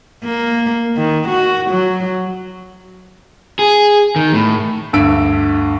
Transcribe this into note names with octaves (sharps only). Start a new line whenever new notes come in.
A#3
D#3
F#4
F#3
G#4
D#3
A2
D2 G2 E6 D7